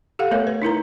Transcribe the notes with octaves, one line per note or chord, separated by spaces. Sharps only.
G4 A4 F5 F#5
A3 B3 A4 A#4 C#5 E5
B4
D#4 E4 A#4 A#5